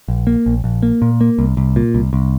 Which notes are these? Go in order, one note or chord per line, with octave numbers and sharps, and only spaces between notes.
A#1
A#3
A#1
A#1
A#3
A#2
A#3
C2
C2
A#2
C2
C2